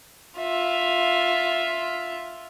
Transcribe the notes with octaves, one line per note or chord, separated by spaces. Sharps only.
F4 E5